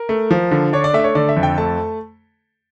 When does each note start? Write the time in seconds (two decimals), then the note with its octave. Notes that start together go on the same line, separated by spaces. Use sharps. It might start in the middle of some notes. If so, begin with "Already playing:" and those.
Already playing: A#4
0.09 A3
0.31 F3
0.51 D3
0.73 D4 C#5
0.84 D5
0.93 A3 E5
0.99 D5
1.04 C#5
1.15 D3 D5
1.29 E5
1.37 F2
1.43 G5
1.57 A3 A5